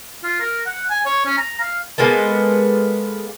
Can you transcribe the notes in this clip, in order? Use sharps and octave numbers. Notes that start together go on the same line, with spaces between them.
F4
A#4
F#5
G#5
C#5
C#4
A#5
F5
G#3 A#3 B3 A4